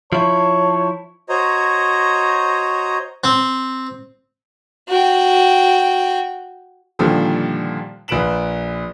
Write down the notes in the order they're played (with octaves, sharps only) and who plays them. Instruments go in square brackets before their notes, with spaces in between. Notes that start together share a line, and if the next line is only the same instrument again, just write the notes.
[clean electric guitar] F3 E4 [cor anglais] C#5 [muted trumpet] A5
[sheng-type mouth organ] F#4 C5 C#5 D#5 A#5
[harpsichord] C4
[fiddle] F#4 G5
[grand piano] A#2 D3 D#3 F3 G3
A#1 B4 D7 E7 F#7